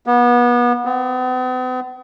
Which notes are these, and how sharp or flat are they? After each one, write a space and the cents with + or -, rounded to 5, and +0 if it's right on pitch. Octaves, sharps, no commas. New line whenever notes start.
B3 -30
B3 +45